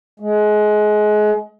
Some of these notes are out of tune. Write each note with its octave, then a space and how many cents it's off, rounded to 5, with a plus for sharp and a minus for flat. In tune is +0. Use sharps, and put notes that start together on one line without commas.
G#3 +25